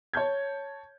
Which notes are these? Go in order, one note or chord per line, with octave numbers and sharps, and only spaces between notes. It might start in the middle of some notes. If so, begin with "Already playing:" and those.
C#5 A5 G6 G#6